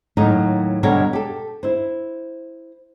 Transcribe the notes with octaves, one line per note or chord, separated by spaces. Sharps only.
D#2 A2 F#3 D#4 A#4
B2 D3 G3 A#4 C#5 F5
G4 A4
E4 C5